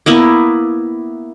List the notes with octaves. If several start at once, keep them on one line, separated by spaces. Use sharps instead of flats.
A#3 B3 E4